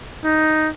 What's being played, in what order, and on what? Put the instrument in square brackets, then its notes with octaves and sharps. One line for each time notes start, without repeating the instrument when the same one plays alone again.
[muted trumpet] D#4